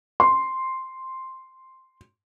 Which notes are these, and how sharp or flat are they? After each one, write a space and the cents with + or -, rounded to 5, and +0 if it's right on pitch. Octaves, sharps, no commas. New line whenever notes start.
C6 +0